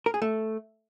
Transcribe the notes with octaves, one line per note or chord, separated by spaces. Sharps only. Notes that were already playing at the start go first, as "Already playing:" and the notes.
A#4
G#4
A3